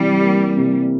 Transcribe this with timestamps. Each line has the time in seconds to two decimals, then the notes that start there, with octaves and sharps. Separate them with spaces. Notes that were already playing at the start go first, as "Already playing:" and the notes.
Already playing: C3 E3 G3
0.21 A#3
0.56 C3